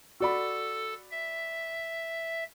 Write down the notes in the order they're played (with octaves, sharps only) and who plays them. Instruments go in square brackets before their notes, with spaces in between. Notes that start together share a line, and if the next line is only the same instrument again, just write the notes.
[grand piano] F#4 D5 B5 [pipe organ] A4
[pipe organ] E5